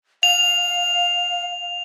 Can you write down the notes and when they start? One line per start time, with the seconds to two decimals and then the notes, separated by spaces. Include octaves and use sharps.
0.23 F5 F7